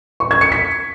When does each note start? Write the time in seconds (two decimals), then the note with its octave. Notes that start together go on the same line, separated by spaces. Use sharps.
0.20 C#6
0.31 G#6
0.41 C#7
0.52 B6